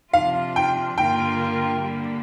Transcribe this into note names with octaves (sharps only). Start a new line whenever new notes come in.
C3 F3 D4 F4 F5
G5
G2 D3 A#3 F4 A#4 G5
D3 G3 A#3